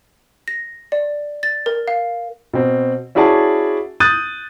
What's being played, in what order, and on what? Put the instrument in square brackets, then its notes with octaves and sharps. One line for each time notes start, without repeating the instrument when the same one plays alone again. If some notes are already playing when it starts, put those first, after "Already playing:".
[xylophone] A#6
D5
A6
A#4
F5
[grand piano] B2 C4
C#4 E4 F#4 G#4 D5 A5
D#6 F#6 G6 A6 D#7